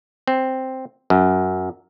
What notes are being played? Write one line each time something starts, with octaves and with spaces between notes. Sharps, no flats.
C4
F#2